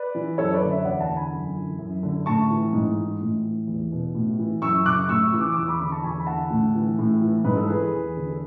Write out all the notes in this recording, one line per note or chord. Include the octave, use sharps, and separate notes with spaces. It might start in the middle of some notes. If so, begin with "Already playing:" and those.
Already playing: B4 D5
E3
F#2 A4 C#5
B4 D5
D3
C#5 E5
E2 D5 F#5
F#5 A5
D3
G#5 B5
F#2
E3
F#2
D3
A2 A5 C#6
E3
G#2
E3
A2
E3
E2
B2
A2
E3
F#2 C#6 E6
C#3 D6 F#6
A2 C#6 E6
E3 E6
D6 F#6
D6
E2 C#6 E6
B5 D6
D3 B5 D6
A5 C#6
E2 G#5 B5
B5
D3 F#5 A5
A2
E3
A2
E3
G#2 B4
A4
E3 G#4 B4
E2
D3
A4